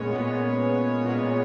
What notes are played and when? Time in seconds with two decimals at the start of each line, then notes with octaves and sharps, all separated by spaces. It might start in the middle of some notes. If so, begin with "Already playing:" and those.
Already playing: A#2 G#3 B3 C#4 C#5
0.11 A#2 G#3 B3
1.04 A#2 G#3 B3